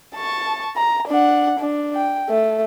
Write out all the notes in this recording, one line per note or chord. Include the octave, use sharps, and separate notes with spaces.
A5 C#6
A#5
D4 F#5
D4
G5
A3